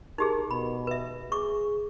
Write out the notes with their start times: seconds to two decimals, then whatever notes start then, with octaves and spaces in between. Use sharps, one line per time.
0.18 D#4 G4 G#4 A#4
0.51 B2 B5
0.87 B4 E5
1.32 G#4 C#6 D6